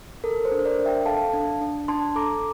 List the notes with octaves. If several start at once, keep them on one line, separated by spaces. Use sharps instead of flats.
A4 A#4
C5
D4
C5
A#4 D5
D4
E5 G5
A4 F5 A5
D4
D4
D4 A5 C6
A4 A#5 D6